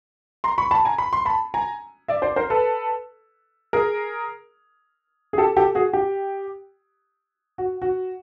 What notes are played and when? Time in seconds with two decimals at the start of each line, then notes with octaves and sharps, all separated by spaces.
0.44 A#5 C6
0.58 B5 C#6
0.71 A5 B5
0.85 G#5 A#5
0.98 B5
1.13 C6
1.25 A5 B5
1.54 G#5 A#5
2.08 D5 E5
2.22 C5 D5
2.36 A#4 C5
2.50 A4 B4
3.73 G#4 A#4
5.33 G#4
5.38 G4 A4
5.56 G4 A4
5.75 F#4 G#4
5.93 G4
7.58 F#4
7.82 F#4